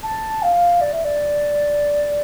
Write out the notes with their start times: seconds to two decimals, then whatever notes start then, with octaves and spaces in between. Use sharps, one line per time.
0.03 A5
0.42 F5
0.81 D5
0.92 E5
1.04 D5